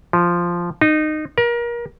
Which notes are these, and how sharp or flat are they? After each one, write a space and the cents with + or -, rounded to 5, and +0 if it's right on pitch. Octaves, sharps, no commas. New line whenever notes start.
F3 -5
D#4 -20
A#4 +30